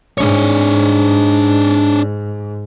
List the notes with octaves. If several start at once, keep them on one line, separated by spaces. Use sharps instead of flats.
G#2 D4 C#5